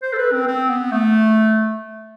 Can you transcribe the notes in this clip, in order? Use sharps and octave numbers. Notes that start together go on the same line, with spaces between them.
C5
A4
B4
C4
C4
B3
A3